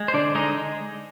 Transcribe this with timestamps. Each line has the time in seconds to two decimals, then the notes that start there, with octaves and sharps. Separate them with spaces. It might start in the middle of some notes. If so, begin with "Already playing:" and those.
Already playing: G#3
0.08 C5
0.14 D3 D4 D5
0.35 G#3 D#4 D#5